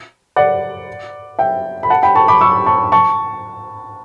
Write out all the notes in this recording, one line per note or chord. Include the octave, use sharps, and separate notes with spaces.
D5 F#5
E5 G5
B5
F#5 A5
G5 B5
A5 C#6
B5 D6
C#6 E6
A5 C#6
A5 C#6